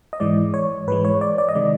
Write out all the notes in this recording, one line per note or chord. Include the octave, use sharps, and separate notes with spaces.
D#5
G#2 E3 G#3 D5
C#5
G#2 E3 G#3 B4
C#5
D5
D5
D#5
C3 D#3 G#3 D5